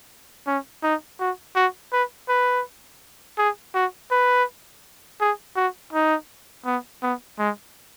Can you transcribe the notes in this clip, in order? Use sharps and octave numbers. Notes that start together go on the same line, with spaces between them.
C#4
D#4
F#4
F#4
B4
B4
G#4
F#4
B4
G#4
F#4
D#4
B3
B3
G#3